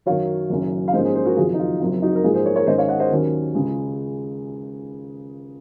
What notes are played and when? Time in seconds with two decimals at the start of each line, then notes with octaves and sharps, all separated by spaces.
0.06 F#2 D#3 F#3 C#5 F5
0.50 F#1 F#2 D#3 F#3 C#4
0.88 F5
0.93 G#2 F3 A#3 C#4 C5 D#5
1.04 G#4 C5
1.15 G#4 C5
1.25 F#4 A#4
1.37 F#1 F2 D#3 F#3 F4 G#4
1.54 D#4
1.59 F4
1.80 F#1 F#2 F3 C4 F4
2.02 D#4 F#4
2.15 A#4
2.24 G#2 F3 A#3 F4 G#4
2.34 G#4 C5
2.45 A#4 C#5
2.56 A#4 C#5
2.67 G#2 D#3 G#3 C#4 C5 D#5
2.78 C#5 F5
2.88 D#5 F#5
3.00 C5 D#5
3.11 D#2 D#3 F#3 C#4
3.55 C#2 C#3 G#3